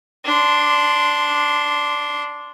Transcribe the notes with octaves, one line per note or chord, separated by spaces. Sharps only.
D4 C6